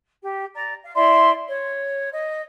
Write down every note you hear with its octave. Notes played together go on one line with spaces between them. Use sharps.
G4
D5 A#5
F5
E4 D5 E5 C6
C#5
D#5